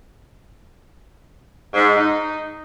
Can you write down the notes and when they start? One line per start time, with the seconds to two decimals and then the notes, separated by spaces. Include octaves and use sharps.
1.73 G#2
1.98 D#4